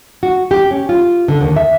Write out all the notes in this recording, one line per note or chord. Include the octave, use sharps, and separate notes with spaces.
F#4
G4
C#4
F4
D3
D#2
E5